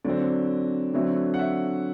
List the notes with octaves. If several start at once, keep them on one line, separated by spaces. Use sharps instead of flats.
D3 F#3 C4 D5
D3 F#3 A3 C4
F#5
E5